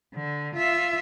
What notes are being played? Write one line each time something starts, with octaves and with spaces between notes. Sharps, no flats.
D3
F4 E5